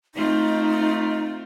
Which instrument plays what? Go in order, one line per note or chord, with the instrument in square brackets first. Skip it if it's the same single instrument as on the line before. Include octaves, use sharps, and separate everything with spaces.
[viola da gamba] A3 C4 F4 [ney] D#4